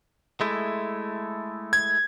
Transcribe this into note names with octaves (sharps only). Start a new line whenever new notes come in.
G#3 A3 E4
G#6